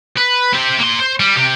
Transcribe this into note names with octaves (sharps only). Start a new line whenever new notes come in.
B4
C4 G4
A#3 C6
C5
G3
C3 G4